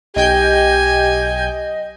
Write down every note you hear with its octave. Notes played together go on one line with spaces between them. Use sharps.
B1 G4 D#5 G5 G#5 G6